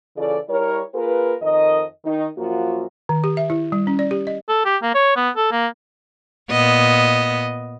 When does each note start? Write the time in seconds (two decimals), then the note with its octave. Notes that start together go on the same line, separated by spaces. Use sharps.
0.17 C#3 E3 F4 A4 D5
0.49 G3 E4 A#4 C#5
0.95 A#3 F4 G#4 A#4 B4
1.41 F2 D#3 A#4 D#5
2.04 D#3 D#4
2.38 F#2 F3 A#3 F4 F#4
3.09 D#3
3.24 G4
3.37 E5
3.50 E4
3.72 G3
3.87 C#4
3.99 D5
4.11 G4
4.27 D#5
4.49 A4
4.65 G4
4.82 A#3
4.95 C#5
5.17 B3
5.37 A4
5.52 A#3
6.50 A#2 B3 D#5